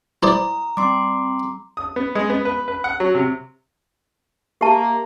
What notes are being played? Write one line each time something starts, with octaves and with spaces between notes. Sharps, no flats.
E4 C5 D5 A#5 D#6
G3 C4 C6 D6
D#6
B3
G#3
B3
B4
B4
F#5
F#3
C3
A#3 G4 E5 A5